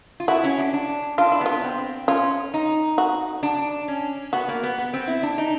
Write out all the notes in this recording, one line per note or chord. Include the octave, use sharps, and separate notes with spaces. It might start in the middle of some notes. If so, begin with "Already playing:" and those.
F4
E4 F#4
C#4
D4
D4
D4 F4
E4
B3 F4
C4
C#4 F4
D#4
F#4
D4
C#4
B3 F#4
A#3
B3
B3
C4
E4
D4
D#4